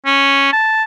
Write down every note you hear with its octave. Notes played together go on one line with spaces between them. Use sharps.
C#4
A5